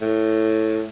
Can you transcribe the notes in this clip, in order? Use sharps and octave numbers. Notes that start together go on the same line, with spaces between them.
A2